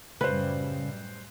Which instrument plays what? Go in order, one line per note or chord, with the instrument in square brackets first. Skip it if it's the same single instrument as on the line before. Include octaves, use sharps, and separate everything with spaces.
[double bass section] F#2 A2 G3 [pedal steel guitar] C#3 [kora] B4 [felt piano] C5 F#6